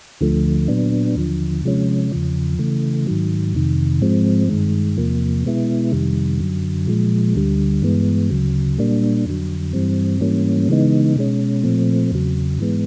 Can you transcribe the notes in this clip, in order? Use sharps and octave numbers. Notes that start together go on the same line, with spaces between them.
D2 D3 F3 A3
A#2 F#3 B3 D4
D#2 D3 F3
C3 F3 G#3 C#4
E2 C#3 F3
C#3 E3 A3
G#2 D#3 F#3
F2 C3 D#3
G#2 F3 G#3 C4
G2 D#3 G#3
E2 C3 F3 A#3
B2 G#3 B3 E4
F2 C3 D#3 G3
F#2 D3 F#3
A#2 F3 G#3
D2 D3 G3
G2 E3 G#3 B3
D2 C#3 F#3
A#2 G3 A#3 D4
F2 D3 F#3
G2 E3 G3 C4
G#2 E3 G3 A#3 C#4
C#3 E3 G#3 B3 D#4
B2 G#3 C#4
A#2 F3 A3 C4
E2 C#3 F#3
G#2 E3 G#3 B3